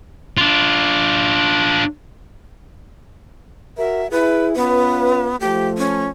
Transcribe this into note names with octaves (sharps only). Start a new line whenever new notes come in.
D4 F4
F#4 A#4 E5
E4 G#4 B4
B3 C#4 F4 B4
F3 A3 G4
C#4